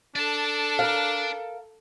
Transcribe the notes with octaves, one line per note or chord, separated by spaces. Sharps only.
D4 A4 D5 A5
A#4 F5